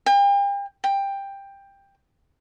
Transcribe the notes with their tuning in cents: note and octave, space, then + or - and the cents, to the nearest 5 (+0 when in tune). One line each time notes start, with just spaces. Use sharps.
G5 +40
G5 +15